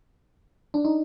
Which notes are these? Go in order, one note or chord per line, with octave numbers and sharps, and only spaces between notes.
D4
D#4